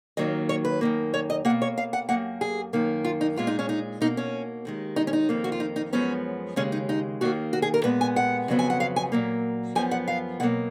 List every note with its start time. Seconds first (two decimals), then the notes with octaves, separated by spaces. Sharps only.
0.17 D#2 D#3 F#3 A#3 D#5
0.49 C#5
0.65 B4
0.81 F#2 D#3 A#3
1.14 C#5
1.30 D#5
1.45 A#3 F#5
1.50 B2
1.62 C#5
1.78 F5
1.93 F#5
2.09 F#2 F3 A#3 F#5
2.41 G#4
2.73 F#2 D#3 A#3
3.04 F4
3.21 D#4
3.36 A#2 G#3 B3 F4
3.47 D#4
3.59 C#4
3.69 D#4
4.01 B2 A#3 D#4
4.17 C#4
4.65 D#2 D#3 G#3
4.96 D#4
5.07 C#4
5.13 D#4
5.29 F2 D#3 A#3
5.44 F#4
5.52 F4
5.60 D#4
5.76 D#4
5.93 F#2 F3 G#3 B3 C#4
6.56 D#2 C#3 G#3 C#4
6.72 D#4
6.89 D#4
7.21 D#2 D#3 A#3 F#4
7.53 F#4
7.62 G#4
7.74 A#4
7.84 A#2 G#3 B3 B4
8.01 G#5
8.16 F#5
8.48 F2 C#3 F#3 B3
8.59 G#5
8.70 F#5
8.80 F5
8.96 G#5
9.12 A#2 F#3 A#3
9.75 F#2 F3 B3 G#5
9.91 F#5
10.08 F5
10.40 B2 F#3 A#3 F#5